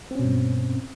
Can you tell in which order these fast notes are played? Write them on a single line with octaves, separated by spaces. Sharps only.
C4 C#4 B2 G2